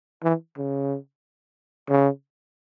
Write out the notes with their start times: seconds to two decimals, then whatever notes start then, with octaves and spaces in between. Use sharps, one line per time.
0.23 E3
0.57 C#3
1.89 C#3